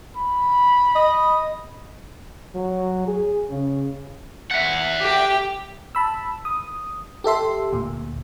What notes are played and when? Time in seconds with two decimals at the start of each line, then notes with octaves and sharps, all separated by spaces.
0.17 B5
0.95 D#5
2.55 F#3
3.07 G#4
3.50 C#3
4.51 E5 F#5
5.00 G4 G5
5.95 A5 B5 E6
6.45 D#6
7.24 G4 A4 E5 C6
7.73 D2 A#2